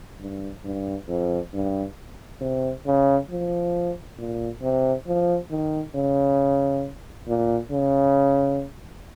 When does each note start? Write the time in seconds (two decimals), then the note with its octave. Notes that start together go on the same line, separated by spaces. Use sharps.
0.20 G2
0.65 G2
1.08 F2
1.53 G2
2.41 C3
2.86 C#3
3.30 F3
4.18 A#2
4.62 C3
5.07 F3
5.51 D#3
5.95 C#3
7.27 A#2
7.71 C#3